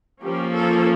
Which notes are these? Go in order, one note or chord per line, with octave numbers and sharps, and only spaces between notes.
F3 A#3 C#4 G4
A4